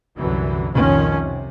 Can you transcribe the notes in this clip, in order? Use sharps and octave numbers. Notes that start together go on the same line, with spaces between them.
C2 F#2 D3 E3 F#3
C2 F2 A#2 D#3 F3 C#4
C3